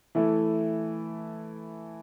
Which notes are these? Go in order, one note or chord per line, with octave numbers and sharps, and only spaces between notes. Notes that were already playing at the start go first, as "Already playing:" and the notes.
E3 A3 E4 A4